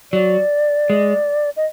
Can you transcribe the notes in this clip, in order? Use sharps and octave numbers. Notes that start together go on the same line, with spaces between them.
F#3 D5
G#3
D#5